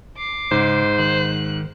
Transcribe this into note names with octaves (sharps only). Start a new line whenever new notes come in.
D6 C7
G#2 C#3 C5
D#3 F#6